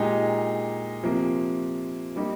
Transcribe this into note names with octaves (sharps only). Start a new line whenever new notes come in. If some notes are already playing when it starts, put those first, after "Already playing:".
Already playing: A#2 G#3 D#4 G4
C3 F3 A#3
G3 A#3 D#4 G4